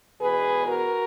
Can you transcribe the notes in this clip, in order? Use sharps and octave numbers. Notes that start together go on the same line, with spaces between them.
E2 B2 G#3 B3 G#4 B4
F#4 A#4